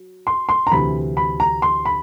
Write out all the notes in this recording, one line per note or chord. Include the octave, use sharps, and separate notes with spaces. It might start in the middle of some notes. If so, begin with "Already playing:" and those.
Already playing: F#3
C6
C6
A#5
D2 C3 E3 B5
B5
A#5
C6
B5